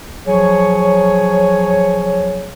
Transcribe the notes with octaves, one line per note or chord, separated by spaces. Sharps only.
F3 F#3 G#4 C#5